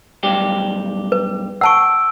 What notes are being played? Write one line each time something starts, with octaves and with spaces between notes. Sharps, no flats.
B1 G2 G4
B4
F#5 A5 C#6 E6 D7